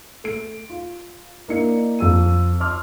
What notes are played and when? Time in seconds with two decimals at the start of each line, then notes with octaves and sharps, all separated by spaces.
0.24 A3 D7
0.70 F4
1.48 A#3 D4 E4 D#5 C#7
1.99 F2 E6 D#7
2.60 D#5 A5 C6 D6 F6